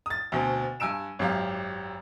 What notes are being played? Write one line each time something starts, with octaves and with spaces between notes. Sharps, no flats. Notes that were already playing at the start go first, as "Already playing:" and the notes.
D#6 A6
D2 B2 C4
G2 G#5 E6 D7 E7
G#1 F#2 G4 F5